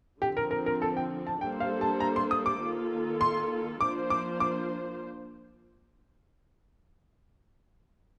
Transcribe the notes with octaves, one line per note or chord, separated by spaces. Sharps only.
D3 F3 C4 G4
A#4
A#4
A#4
A4
G5
A5
G3 A#3 D4 A4 C5 G5
F5
A5
A#5
C6
D#6
D6
D#3 A#3 F4 A4
C6
F3 A#3 D4 F4 C5 D6
D6
D6